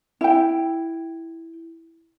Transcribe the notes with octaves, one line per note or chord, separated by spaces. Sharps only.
E4 G5